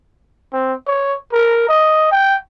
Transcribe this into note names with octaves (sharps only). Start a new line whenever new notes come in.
C4
C#5
A#4
D#5
G5